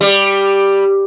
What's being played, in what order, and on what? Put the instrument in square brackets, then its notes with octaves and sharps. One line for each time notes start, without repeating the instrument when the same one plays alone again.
[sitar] G3